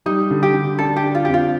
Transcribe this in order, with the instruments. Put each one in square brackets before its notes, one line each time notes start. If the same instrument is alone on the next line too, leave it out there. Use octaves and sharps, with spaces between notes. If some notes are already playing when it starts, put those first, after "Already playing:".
[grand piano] G3 [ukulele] D#4
[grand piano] D3
[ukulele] G4
[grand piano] D3
[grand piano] D4 [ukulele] A4
[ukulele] G4
[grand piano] D4
[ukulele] F4
[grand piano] F2 [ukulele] G4
[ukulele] F4